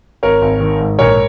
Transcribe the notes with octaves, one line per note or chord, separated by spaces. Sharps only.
G#1 A#4 C#5
G#1
D#3
G#2
A#1 A#4 C#5